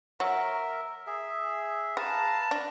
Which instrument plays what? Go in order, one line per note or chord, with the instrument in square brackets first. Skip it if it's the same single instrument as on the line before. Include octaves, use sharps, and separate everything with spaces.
[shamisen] F#3 [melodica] A#4 E5
[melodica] G#4 E5
[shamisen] G#4 [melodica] B4 F5 A#5 [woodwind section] A5
[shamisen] D4